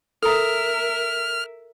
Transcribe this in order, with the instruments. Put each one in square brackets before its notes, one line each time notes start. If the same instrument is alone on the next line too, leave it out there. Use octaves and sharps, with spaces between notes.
[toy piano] A4 A#5 [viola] A#4 E5 [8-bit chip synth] F6